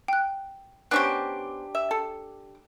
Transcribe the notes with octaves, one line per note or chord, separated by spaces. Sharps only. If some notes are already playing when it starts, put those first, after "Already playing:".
G5 F#6
B3 C#4 D4 F#4 G4 C5 C#6 F#6
E5
A4